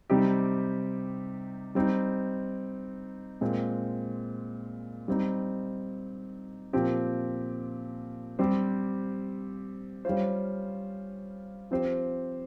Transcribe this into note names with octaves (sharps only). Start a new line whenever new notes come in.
C3 G3 C4 D#4 G4
G3 C4 D#4
A#2 G#3 C4
G3 C4 D#4
A#2 F3 C4 G4
G3 C4 G4 C5
G3 C#4 F4 C5
F3 C4 G4 C5